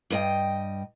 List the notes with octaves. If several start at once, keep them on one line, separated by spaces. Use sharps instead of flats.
G2 D#5 G5